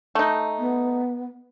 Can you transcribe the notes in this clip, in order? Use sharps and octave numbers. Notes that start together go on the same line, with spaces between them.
A3 D#4
B3